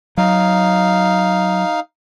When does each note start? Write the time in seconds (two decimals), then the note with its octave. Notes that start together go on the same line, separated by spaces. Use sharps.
0.18 F#3 D#4 F5